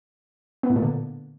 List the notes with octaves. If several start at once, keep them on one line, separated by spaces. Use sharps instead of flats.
B3
A2
A#2
D3